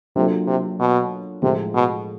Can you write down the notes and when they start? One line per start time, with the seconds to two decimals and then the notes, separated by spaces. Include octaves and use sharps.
0.16 C3 F#3 A#3 D4 F4 A4
0.47 C3
0.80 B2
1.42 A2 C3 F3 G#3
1.75 B2